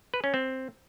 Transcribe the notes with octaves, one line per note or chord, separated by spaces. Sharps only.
B4
C#4
C4